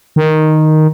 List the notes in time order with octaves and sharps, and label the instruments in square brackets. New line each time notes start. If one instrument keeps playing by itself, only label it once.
[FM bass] D#3